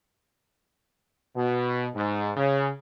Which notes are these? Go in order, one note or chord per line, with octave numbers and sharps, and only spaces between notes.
B2
G#2
C#3